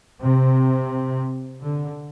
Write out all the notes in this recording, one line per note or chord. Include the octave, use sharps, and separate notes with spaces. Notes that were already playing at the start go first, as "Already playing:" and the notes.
C3
D3